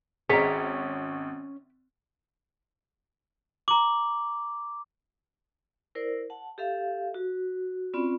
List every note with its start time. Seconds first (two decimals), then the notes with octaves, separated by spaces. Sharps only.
0.30 G#1 C#4 G#4 C#5 E5 G5 A#5
3.68 A#5 D6 F#7
5.95 E4 A#4 C5 D5
6.30 F#5 A5
6.58 G4 A4 E5 F5
7.14 F#4
7.94 C4 C#4 F4 D5 B5